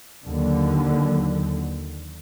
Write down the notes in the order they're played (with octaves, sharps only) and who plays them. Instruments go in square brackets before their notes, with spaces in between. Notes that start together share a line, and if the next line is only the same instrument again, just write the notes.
[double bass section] D#2 D3 D#3 F#3